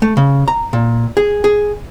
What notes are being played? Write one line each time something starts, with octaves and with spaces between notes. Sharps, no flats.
A3
C#3
A#5
A#2
G#4
G#4